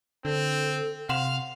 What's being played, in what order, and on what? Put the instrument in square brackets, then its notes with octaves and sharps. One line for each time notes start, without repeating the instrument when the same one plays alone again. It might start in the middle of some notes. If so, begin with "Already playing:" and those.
[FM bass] D3 [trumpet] C4 [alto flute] A4
[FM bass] C3 [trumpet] F5 [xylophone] F#5 C6 E7